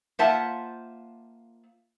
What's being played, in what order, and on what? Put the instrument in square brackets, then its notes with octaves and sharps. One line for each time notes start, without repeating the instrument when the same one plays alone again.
[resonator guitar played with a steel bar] A#3 F4 C5 E5 F#5 A5